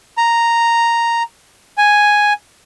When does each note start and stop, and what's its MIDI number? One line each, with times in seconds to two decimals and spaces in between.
0.18 1.23 82
1.78 2.33 80